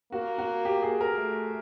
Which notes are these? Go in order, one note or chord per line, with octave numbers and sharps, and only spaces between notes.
A#3 F#4
F#4
G4
G#4
A#4
A3